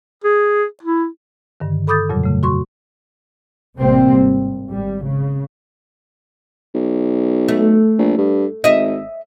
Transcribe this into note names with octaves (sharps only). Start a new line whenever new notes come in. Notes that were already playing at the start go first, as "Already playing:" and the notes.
G#4
E4
G2 D3 D#3
A4 B5 D6 D#6 G6 A6
F2 A#2 C#3 F#3 G3
C#3 A3
F#4 C6 C#6
A1 C3 G3 A#3 C4
G#1
G#1 G3
C#3
B1
A3
A#1
G2
G#1 D#5 E5